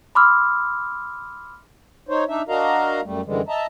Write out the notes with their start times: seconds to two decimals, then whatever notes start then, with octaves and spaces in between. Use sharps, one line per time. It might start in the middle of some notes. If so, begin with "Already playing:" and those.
0.15 B5 C6 D6 E6 F6
2.09 D#4 C5 C#5
2.28 D4 D#4 E5
2.49 D4 F#4 A#4 D#5 F5 A#5
3.04 F#2 G3 A3
3.26 F#2 D3 E3 G3 G#3
3.48 D#5 E5 A5 A#5